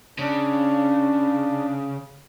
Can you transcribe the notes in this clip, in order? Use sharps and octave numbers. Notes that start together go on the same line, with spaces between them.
C#3 D4